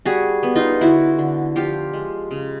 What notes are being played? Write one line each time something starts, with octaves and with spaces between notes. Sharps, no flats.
G3 F#4 G#4
B3
D#4 F4
D3 E4 F#4
D3
F3 F4 G4
G#3
C#3